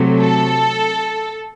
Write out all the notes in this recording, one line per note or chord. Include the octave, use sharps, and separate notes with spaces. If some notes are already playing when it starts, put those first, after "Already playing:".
Already playing: C3 F#3 A3
A4